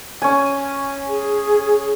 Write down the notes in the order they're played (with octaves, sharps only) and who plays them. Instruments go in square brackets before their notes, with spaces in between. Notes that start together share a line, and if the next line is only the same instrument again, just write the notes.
[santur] C#4 G#5
[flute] G#4